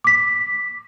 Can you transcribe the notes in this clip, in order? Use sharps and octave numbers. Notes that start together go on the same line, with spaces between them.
D6 B6